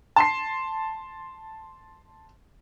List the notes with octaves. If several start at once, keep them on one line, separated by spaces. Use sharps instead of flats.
A5 C6 C7